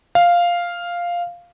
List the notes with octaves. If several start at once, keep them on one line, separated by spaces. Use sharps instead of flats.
F5